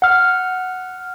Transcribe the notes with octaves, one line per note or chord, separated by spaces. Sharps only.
F#5 F6